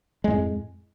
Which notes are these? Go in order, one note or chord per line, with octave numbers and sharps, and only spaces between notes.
F2 A2 G#3